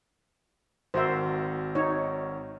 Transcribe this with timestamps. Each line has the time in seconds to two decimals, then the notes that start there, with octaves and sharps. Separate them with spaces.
0.94 G#1 F#4 A#4 C5 E5
1.75 D#4 C#5